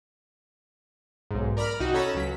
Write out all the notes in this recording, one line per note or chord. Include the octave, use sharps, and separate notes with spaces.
B1 G#2
A#4 D5 A#5 B5 F6
C2 D#4 F#4
C#4 A4 A#5 B5 E7
C#2 F#3 B6